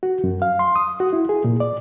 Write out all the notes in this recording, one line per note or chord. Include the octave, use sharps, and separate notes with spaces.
F#4
F#2
F5
C6
D#6
F#4
E4
G#4
A#2
D5